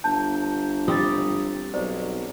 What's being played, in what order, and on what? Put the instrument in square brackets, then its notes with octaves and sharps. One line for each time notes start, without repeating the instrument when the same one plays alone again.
[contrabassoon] G1 [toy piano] A5 [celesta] G6
[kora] G3 C4 G4 [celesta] D#6 A6
[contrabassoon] B1 [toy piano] C5 [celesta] D5